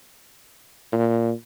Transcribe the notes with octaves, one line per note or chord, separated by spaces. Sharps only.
A#2